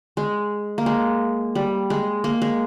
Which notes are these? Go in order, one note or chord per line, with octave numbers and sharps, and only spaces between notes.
G#3
A#3
G#3
G3
G#3
A#3
G#3